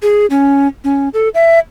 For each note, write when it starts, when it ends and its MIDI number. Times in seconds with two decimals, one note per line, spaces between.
0.02 0.26 68
0.30 0.67 61
0.84 1.09 61
1.14 1.29 69
1.34 1.59 76